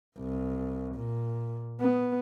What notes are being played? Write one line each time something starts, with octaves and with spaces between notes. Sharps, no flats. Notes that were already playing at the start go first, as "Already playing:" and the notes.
C2
A#2
B3